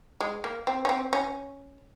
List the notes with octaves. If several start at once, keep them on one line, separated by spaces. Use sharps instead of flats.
G#3
A#3
C4
C#4
C4
C#4